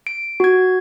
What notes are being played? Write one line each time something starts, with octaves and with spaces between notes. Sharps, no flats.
D7
F#4 G#6